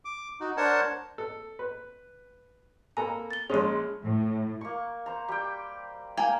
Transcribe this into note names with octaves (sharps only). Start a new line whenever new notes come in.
D6
D#4 F#4
D4 A#4 C5 C#5 F#5 A5
A4
B4
A#3 A4 G#5 A#5 B5
A6 G7
A#1 G#3 C#4 G#4 C6
A2
A#3 C#6
C5 A#5
G3 G5
A#3 G5 G#5